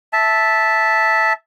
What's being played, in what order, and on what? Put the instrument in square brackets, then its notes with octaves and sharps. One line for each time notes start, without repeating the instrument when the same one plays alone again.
[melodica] E5 A5